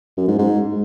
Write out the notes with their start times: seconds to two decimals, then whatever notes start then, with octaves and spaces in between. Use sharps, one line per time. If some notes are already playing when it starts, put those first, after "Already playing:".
0.17 F#2
0.28 G#2
0.38 G#2